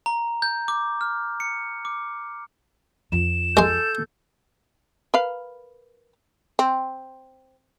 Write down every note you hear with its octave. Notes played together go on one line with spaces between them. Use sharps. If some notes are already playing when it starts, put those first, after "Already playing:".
A#5
G6
D6
F6
C#7
D6
F2 F3 E7
G#3 A4 C6 G6
A#4 B4 F5
C4